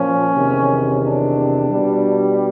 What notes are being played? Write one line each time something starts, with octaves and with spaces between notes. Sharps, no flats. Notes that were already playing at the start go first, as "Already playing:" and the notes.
Already playing: A#2 F3 C#4
E2 C3 D#3
D4
B2 G3